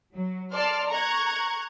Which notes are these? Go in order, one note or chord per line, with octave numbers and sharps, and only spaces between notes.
F#3
D5 A5 C6 F6
A#5 C#6 F#6 G#6